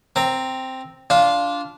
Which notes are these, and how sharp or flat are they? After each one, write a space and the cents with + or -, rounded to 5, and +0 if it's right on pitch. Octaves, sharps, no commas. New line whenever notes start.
C4 +0 A#5 -10
D4 -20 F4 +0